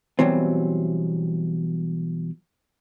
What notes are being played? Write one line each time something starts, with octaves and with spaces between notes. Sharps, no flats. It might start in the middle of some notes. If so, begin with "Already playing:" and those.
B2 E3 F#3 G3 C4